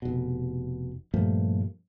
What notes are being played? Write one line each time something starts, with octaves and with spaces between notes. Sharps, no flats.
F1 B2
G2 A#2 F3 A3